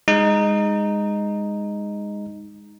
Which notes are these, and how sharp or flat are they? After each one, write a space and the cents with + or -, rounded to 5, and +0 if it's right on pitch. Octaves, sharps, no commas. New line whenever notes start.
G#3 -20 D#4 -5